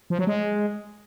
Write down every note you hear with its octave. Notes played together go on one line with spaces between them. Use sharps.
F3
F#3
G#3